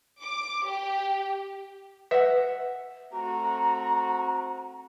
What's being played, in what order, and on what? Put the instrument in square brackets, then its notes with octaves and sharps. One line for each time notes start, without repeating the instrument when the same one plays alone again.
[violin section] D6
G4
[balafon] B4 [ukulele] E5 F#5
[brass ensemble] A3 C4 F#4 [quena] A#5